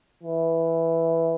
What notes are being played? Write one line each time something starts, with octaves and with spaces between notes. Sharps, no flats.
E3